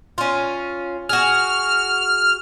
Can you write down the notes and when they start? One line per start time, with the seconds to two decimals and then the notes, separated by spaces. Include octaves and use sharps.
0.18 C#4 F4
1.09 F#4 G#4 F6